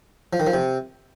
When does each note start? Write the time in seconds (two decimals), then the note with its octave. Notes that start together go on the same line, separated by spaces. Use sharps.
0.33 F3
0.40 D#3
0.47 F3
0.53 C3